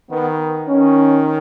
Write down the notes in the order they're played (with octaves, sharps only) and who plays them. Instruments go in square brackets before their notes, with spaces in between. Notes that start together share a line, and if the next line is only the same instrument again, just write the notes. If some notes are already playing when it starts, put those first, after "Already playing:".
[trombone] D#3 [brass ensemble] B3
[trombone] D#3 [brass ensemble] C#4